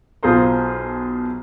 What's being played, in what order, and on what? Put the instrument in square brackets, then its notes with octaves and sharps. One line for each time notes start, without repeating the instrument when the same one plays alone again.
[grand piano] B1 F4 G#4 A#4 C5 A#5